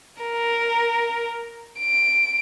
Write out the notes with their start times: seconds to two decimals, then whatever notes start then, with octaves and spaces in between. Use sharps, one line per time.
0.22 A#4
1.80 D7